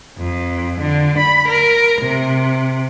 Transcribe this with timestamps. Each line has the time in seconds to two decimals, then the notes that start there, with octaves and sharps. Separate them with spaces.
0.18 F2
0.80 D3
1.17 B5
1.47 A#4
2.00 C3